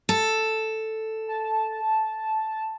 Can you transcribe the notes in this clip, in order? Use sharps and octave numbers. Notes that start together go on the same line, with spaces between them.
A4
A5